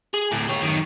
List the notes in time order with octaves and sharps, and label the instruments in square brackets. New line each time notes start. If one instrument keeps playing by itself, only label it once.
[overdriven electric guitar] G#4
D2 A2
G4 C#5
F#2 D#3